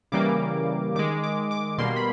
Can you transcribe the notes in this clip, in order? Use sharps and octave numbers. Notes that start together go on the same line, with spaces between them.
C#3 E3 G3 A#3 D6
D#3 G#3 D6
D6
D6
B2 G3 A#3 C6
B5